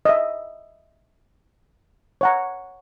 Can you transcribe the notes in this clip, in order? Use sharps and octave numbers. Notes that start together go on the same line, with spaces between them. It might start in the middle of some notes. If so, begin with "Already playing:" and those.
D#5 E5
C#5 F#5 A#5